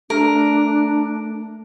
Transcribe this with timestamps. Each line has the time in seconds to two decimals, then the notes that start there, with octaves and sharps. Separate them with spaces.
0.10 A3 D4 A#4